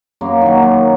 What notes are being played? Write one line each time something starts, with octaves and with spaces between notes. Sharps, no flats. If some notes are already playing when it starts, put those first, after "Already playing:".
F#2 A#3
D#3 F#3
F#2